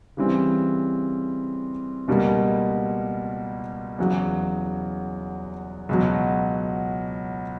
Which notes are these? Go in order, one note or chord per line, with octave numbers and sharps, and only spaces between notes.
C#3 E3 G3 C4
C#2 B2 G3 A#3
E2 C#3 F#3
C#2 B2 F#3